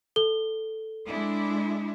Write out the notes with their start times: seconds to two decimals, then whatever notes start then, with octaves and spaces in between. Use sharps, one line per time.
0.16 A4 G7
1.06 G#3 D4 E4